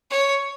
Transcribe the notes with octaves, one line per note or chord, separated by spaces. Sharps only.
C#5